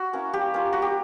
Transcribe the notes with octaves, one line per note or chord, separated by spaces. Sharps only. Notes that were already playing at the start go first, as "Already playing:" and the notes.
Already playing: F#4
A#3 C#4 E4
G3 G4
A#3 C#4 F4
G3 F#4
G4